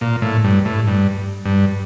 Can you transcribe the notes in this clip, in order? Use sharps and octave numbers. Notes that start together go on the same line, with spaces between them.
A#2
A2
G2
A2
G2
G2